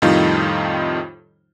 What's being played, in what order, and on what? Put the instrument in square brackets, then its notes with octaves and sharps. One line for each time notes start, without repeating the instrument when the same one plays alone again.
[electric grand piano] F2 A2 D#3 G3 D#4 F4